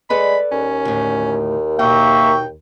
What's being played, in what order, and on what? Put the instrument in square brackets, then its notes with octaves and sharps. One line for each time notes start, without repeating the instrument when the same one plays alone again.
[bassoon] G#3 [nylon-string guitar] A4 B4 D5 [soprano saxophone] B5
[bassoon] D#2 [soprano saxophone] C#4
[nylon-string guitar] D2 A2
[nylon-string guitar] B2 D#4 [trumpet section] A#3 E5 C#6 [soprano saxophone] G5